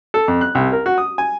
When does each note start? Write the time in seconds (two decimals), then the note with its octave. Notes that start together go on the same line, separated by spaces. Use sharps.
0.14 A4
0.28 F2
0.41 F#6
0.55 C2
0.72 A#4
0.86 F#4
0.98 D#6
1.18 G#5